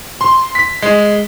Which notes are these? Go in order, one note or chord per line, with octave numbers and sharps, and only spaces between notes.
C6
B6
G#3